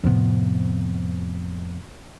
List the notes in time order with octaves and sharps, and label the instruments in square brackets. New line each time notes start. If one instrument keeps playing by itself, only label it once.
[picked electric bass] F2 F3 B3 [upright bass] A2 C3